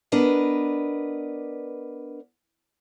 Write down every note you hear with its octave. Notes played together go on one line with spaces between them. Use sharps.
B3 D4 A#4 B4 D5 D#5